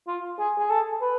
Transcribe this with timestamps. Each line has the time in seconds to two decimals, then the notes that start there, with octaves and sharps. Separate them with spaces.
0.07 F4
0.39 G#4
0.59 G#4
0.70 A4
1.01 B4